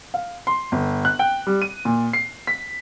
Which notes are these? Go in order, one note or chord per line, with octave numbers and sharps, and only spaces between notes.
F5
C6
G1
F#6
G5
G3
D#7
A#2
C7
B6